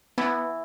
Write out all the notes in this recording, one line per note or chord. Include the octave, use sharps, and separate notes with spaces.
E3 B3